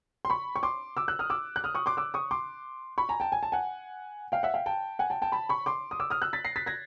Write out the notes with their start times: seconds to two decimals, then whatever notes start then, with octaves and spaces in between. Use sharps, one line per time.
0.25 C6
0.30 B5 C#6
0.56 C#6
0.63 C6 D6
0.97 D6 E6
1.08 E6 F#6
1.19 D#6 F6
1.30 D6 E6
1.56 F#6
1.64 D#6 F6
1.75 C#6 D#6
1.86 C6 D6
1.97 D6 E6
2.14 C#6 D#6
2.31 C6 D6
2.98 B5 C#6
3.09 G#5 A#5
3.20 G5 A5
3.32 G#5
3.43 A5
3.52 F#5 G#5
4.32 F5 G5
4.43 E5 F#5
4.54 F5 G5
4.66 G5 A5
4.99 F#5 G#5
5.10 G5 A5
5.22 G5 A5
5.32 A5 B5
5.49 B5 C#6
5.66 C6 D6
5.91 D#6
6.00 D6 E6
6.10 D#6 F6
6.22 E6 F#6
6.33 A6 B6
6.45 A#6 C7
6.56 A6 B6
6.66 G#6 A#6